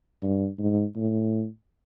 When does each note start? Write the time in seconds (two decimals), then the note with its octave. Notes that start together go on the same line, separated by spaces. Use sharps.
0.22 G2
0.59 G#2
0.96 A2